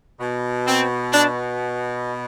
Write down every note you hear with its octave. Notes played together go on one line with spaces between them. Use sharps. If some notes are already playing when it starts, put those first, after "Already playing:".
B2
C4
D4